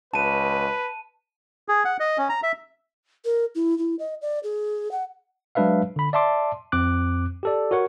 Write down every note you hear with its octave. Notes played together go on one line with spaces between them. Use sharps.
C#2 B4 A5 D#7
G#4
F#5
D#5
C#4
A#5
E5
A#4
E4
E4
D#5
D5
G#4
F#5
F#3 G#3 D4 B4 E5 F5
D3 B5
D5 E5 A5 C6 D6
F2 C4 D6 F#6
G4 A4 D5
F#4 A#4 C#5 F#5 C#6